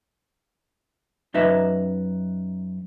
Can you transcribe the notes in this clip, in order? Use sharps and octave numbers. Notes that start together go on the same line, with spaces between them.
F#2 D#4 B4 E5